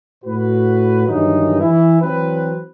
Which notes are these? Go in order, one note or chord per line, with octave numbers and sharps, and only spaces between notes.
A2 F#4 B4
G2 D#3 E3 F#3 D#4
E3 E4
E3 F#3 C4 B4